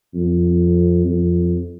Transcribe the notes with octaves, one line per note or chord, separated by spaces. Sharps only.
F2
F2